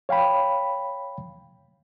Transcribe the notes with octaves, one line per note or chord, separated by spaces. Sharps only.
C#5 F5 G5 B5